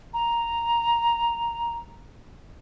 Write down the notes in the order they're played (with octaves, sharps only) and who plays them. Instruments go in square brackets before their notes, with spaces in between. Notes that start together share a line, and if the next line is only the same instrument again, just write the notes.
[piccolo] A#5